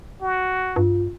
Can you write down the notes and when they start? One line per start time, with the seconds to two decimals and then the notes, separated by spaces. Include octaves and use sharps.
0.22 F#4
0.76 G2 F4